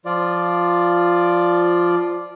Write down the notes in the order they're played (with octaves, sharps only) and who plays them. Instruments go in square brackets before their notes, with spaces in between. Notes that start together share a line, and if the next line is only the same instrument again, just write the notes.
[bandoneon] F3 F4 D5